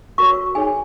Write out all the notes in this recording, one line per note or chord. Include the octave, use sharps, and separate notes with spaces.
F#4 A#4 C#5 C#6
D#4 G#4 C#5 G#5